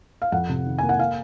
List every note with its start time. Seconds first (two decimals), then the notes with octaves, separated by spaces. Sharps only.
0.22 F5
0.32 F2 F#5
0.49 C3
0.66 D#3
0.79 A#3 G#5
0.89 F#5
0.99 F5